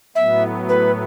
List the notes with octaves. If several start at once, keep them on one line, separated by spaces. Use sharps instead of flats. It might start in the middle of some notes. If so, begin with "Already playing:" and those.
A2 F#3 B3 E5
B4